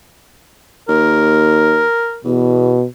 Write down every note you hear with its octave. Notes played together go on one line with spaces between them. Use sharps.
D#2 A#4
E2 B2